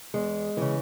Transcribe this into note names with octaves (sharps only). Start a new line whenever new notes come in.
E2 G#3
C#3 E3